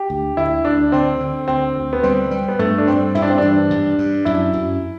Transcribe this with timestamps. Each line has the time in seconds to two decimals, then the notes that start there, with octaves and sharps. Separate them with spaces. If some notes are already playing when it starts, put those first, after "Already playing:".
Already playing: G4
0.10 D2
0.37 D2 E4
0.65 D2 D4
0.92 D3 C4
1.20 D3
1.48 D2 C4
1.76 D2
1.93 B3
2.03 G3 C4
2.31 G3
2.48 B3
2.59 G2 A3
2.78 D4
2.87 G3 C4
3.15 G2 E4
3.22 D4
3.30 C4
3.38 E3 D4
3.70 G2
3.98 G2
4.25 F#2 E4
4.53 F#2